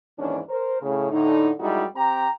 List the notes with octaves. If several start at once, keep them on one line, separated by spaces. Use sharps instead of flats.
D#2 G#2 E3 C#4 D4
A#4 C5
A2 C#3
A2 D3 D#4
F#2 G3 G#3 D#4 E4 F#4
C4 G4 G5 A#5